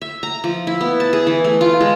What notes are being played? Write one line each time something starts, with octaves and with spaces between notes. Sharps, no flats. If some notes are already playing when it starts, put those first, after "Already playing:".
E5
A#5
F3
E4
B3
A5
G#4
E3
A3
F4
G#3